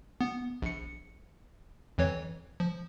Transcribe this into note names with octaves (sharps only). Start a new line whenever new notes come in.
B3
A#1 C#7
F2 E3 C#5
F3